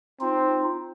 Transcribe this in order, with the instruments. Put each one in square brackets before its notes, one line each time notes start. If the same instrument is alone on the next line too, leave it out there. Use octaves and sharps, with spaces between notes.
[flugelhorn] C4 [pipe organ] D#4 F4